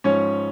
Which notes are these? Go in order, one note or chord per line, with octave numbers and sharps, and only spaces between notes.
G#2 F3 C#4 C#5